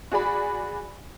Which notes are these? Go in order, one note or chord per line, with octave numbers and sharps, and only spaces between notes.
F#4 G#4 D5 B5